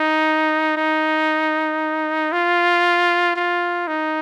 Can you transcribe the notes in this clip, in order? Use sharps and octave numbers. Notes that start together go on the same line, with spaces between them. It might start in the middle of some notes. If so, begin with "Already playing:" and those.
Already playing: D#4
D#4
F4
F4
D#4